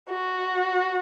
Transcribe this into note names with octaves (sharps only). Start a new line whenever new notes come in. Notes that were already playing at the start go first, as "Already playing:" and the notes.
F#4